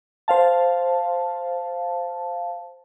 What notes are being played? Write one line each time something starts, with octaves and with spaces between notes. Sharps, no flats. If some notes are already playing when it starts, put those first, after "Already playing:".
C5 F5 A5